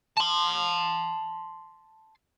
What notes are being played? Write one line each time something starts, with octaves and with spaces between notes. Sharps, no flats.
A5 C6